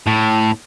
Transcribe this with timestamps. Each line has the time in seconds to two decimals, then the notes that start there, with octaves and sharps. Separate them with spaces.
0.07 A2